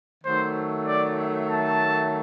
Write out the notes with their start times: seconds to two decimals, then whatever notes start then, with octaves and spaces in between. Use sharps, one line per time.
0.24 D#3 F#3 A3 C5
0.87 D5
1.49 A5